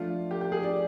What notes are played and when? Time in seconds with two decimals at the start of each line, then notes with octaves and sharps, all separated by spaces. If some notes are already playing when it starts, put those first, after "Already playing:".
Already playing: F3 A3 D4 F4
0.31 G4
0.41 G4
0.52 G#4
0.63 D5